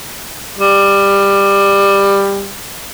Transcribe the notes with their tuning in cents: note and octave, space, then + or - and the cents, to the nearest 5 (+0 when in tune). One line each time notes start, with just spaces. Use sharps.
G3 +15